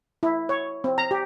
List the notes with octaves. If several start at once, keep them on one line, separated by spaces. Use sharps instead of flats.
E4
C#5
C4
A#5
G4